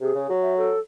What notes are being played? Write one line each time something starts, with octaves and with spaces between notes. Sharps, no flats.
C3 G#4
C#3
F#3
E5
A4